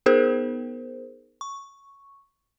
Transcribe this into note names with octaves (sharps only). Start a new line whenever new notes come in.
B3 D#4 G#4 A#4 C5
C#6